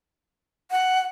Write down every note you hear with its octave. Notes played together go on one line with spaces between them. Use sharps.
F#5